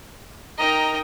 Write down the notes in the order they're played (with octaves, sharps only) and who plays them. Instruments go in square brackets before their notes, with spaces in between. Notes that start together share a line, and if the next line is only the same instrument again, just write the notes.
[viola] D#4 A#4 [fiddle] D#5 G5 [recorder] A#5